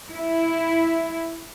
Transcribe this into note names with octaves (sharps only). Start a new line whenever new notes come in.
E4